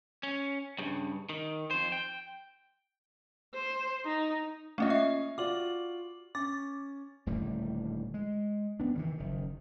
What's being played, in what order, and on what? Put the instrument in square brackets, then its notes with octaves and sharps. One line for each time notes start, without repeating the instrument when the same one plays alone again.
[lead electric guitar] C#4
G2 C#3
D#3
F2 C5
G5
[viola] C5
D#4
[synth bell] A3 A#3 F4 [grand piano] C#4 D#5
[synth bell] E5
[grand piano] F4 F#4 D5 [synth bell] D6 F#7
[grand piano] C#4 [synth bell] D6 A6
[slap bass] D#1 A2 D3 G3
G#3
B3 D4
C3 D#3 E3 G3
F#1 D#3